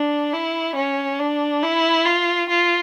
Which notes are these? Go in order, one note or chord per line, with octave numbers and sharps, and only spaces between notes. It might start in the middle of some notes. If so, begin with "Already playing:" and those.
Already playing: D4
E4
C#4
D4
E4
F4
F4